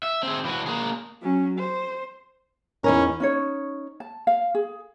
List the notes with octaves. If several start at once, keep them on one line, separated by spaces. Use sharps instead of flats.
E5
C4 G#4
E3 F#4
A#3 G#4
F#3 C#4
C5
E2 C#4 D#4 A#4
C#4 D#4 C#5
A5
F5
G#4